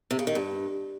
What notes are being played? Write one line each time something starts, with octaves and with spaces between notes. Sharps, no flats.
C3
C#3
D#3
G2